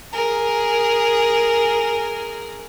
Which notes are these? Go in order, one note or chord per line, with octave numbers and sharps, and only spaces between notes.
G#4 A#4